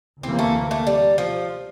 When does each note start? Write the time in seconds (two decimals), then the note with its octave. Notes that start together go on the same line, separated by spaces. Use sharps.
0.23 D2 C3 E3 A#3 C4
0.39 A3
0.71 A3
0.87 G3
1.18 F3